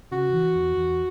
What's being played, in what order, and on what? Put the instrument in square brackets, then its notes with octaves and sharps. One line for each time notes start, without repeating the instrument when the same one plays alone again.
[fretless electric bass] C#3 [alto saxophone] F#4
[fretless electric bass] E3
E2
E2